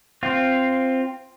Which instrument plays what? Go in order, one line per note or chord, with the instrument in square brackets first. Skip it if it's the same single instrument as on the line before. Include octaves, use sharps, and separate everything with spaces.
[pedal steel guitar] C4 F4